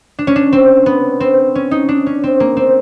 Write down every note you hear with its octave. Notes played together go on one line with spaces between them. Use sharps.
D4
C#4
D4
C4
B3
C4
C#4
D#4
D4
C#4
C4
A#3
C4